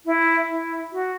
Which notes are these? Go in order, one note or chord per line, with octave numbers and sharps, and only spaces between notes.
E4
E4
F#4